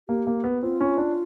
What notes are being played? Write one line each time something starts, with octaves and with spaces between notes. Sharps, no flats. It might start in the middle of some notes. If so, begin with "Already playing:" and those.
A#3 G4
A#3
B3
C4 F4
C#4
D4